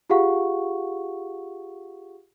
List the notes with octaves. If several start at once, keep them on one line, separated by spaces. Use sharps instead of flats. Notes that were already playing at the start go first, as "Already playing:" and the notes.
F4 G4 G#4 F5 F#5 C#6